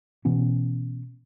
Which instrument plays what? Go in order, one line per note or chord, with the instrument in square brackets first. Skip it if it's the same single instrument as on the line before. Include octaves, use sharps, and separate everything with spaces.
[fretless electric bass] B2 E3 B3 C#4